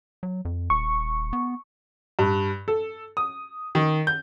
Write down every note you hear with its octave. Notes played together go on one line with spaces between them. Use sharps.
F#3
F2
D#1 C#6
B3
G2
A4
D#6
D#3
G6